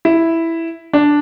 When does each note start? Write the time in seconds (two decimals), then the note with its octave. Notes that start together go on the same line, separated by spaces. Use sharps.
0.05 E4
0.93 D4